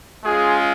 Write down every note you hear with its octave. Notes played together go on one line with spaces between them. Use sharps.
G#3 C#4 F4 G#4